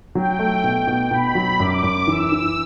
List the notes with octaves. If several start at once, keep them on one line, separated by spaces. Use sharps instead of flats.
F#3 G5
A3
B2
B2
B2 B5
F#3
F#2 D6
F#2
E3 E6
E3